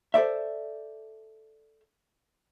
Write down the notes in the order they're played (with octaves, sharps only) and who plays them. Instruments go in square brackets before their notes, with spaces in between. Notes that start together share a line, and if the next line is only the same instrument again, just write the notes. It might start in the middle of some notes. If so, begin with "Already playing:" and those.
[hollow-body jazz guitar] A4 C5 D5 E5